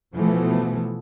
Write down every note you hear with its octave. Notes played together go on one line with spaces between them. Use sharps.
B2 E3 F3 A3 B3